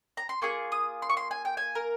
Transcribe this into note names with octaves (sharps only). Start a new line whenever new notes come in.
A#5
C6
A#3 F4 G#4 C#6
D#6
C6
C#6
C6
G#5
G5
G#5
A#4